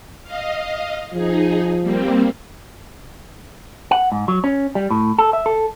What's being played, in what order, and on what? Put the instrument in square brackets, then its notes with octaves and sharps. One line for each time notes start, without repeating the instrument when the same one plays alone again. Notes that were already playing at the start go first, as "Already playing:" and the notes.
[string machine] D#5 F5
[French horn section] F3 [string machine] D#4 G#4
[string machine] G3 A#3 C4
[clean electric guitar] F#5
G#2
F#3
C#4
G3
A2
A4
E5
A4